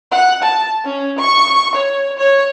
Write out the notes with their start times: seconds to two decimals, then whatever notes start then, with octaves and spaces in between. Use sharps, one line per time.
0.11 F#5
0.43 A5
0.85 C#4
1.19 C#6
1.75 C#5
2.18 C#5